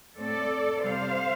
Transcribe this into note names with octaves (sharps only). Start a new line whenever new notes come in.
A2 A3 C4 A4 D5
C3 G3 C4 C5 F5